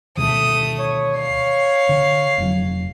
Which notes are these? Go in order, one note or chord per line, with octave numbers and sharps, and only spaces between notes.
D2 B2 D#3 A3 D#6
C#5
C#5 F5 C7
D3
F1 F#3